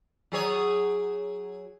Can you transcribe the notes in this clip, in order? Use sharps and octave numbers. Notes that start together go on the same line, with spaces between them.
F#3 G#4 C#5